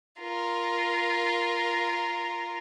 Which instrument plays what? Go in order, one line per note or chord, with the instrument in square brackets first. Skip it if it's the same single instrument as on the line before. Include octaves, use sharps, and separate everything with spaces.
[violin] F4 A#4